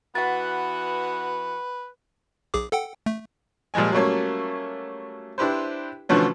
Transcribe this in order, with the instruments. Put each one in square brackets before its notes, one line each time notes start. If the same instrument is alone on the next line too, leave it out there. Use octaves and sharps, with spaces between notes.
[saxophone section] E3 B3 F#4 [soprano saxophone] B4 [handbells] F#5 A6
[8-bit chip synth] B1 G#4 D6
A4 F#5 G5
A3
[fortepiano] A#2 F3 G3 G#3 G#5
F#3 G3 A3 A#3 C#4
D4 E4 G4 B4 C5
B2 D3 E3 F3 A3 C#4